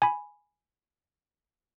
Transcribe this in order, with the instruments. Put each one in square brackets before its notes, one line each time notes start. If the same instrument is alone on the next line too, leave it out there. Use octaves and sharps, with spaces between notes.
[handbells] G#5 B5